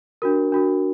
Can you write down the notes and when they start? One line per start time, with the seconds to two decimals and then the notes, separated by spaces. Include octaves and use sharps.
0.22 D4 F#4 A#4
0.52 D4 F#4 A#4